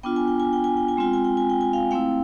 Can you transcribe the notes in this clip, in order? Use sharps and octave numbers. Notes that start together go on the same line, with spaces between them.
B3 D4 F4 G5
G#5
G5
G#5
G5
G#5
G5
G#5
G#3 C4 F4 G5
G#5
G5
G#5
G5
G#5
F5 G5
A3 C4 E4 F5 G5